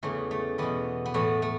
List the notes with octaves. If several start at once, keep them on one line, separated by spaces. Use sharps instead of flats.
E2 C#3 E3 A3
A3
E2 B2 B3
B3
A2 E3 A3
A3